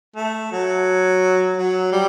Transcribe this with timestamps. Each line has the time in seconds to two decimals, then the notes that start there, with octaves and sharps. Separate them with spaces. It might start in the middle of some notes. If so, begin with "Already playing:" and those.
0.16 A3
0.52 F#3
1.56 F#3
1.92 G3